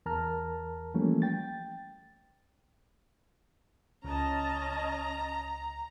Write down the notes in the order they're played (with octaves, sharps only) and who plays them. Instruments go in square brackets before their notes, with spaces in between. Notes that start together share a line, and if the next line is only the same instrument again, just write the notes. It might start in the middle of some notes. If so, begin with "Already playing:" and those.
[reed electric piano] E2 A#4 A5 A#5 F6
E3 F3 G3 A3 A#3 C#4
G5 A6
[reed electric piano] C#2 [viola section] C#4 D#5 A5 [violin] A#5